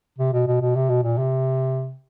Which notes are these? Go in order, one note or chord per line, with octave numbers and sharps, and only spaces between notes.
C3
B2
B2
B2
C3
B2
A#2
C3